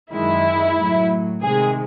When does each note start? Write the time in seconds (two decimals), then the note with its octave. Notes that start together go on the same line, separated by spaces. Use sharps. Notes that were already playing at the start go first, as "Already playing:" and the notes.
0.12 F#2 D#3 G#3 E4
0.77 A2 F#3
1.42 C3 D#3 G#3 G#4